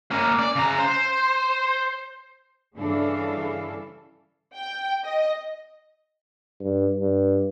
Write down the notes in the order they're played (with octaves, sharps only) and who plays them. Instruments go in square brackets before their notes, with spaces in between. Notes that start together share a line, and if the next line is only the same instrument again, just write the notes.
[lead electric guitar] A#3 C#4
D5
C#3 A#5
C5
[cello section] G2 C#3 E3 D4 A4 F5
[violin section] G5
D#5
[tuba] G2
G2